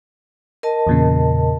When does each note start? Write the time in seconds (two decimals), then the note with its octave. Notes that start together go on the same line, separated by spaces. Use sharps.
0.63 A#4 D#5 A5
0.87 E2 A#2 C#3